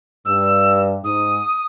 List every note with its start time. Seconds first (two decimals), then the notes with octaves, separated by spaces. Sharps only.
0.25 G2 E6
1.04 G#2 D#6